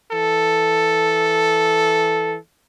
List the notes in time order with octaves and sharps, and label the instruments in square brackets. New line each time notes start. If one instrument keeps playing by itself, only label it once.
[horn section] E3 A4